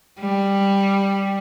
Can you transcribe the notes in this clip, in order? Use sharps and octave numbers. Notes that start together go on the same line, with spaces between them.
G3